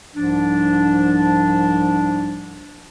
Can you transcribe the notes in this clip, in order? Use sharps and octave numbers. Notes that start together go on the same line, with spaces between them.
C2 G#2 F3 D4